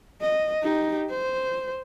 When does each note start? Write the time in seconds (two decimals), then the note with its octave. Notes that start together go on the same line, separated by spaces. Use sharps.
0.22 D#5
0.62 D#4 G4
1.11 C5